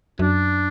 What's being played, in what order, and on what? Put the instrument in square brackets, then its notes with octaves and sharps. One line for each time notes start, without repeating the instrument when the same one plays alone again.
[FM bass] F#2 [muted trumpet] D4